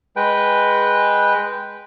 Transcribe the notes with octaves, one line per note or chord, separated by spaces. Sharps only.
G#3 B4 G5